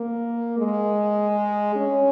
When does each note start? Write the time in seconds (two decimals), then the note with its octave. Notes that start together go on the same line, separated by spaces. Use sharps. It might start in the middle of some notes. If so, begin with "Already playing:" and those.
Already playing: A#3
0.59 G#3
1.75 C#4